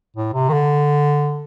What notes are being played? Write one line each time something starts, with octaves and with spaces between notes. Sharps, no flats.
A2
C3
D#3
D3